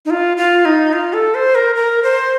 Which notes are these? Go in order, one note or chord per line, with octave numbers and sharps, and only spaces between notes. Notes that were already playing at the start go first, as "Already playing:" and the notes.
D#4
F4
F4
D#4
F4
A4
C5
A#4
A#4
C5